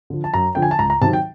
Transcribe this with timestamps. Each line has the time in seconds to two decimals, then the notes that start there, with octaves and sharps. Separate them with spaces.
0.10 D3 F3
0.24 A5
0.34 F#2 A#5
0.55 D3 F3 G5
0.62 G#5
0.71 A5
0.79 C#2 A#5
0.90 A#5
1.02 C3 D#3 F#3 A5
1.13 G5